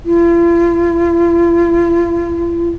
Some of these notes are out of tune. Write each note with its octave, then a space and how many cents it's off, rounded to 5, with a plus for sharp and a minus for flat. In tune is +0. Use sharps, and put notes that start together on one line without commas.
F4 -45